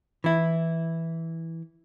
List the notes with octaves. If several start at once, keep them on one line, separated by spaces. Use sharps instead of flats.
E3 E4